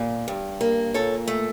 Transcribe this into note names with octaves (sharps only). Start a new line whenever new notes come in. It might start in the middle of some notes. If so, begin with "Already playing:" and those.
Already playing: A#2
G2
A#3
A#2 A4 C#5
A3